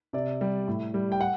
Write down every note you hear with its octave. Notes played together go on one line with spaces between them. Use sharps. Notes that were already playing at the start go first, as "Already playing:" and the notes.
C3 D5
G3
A2
G3
G5
F#5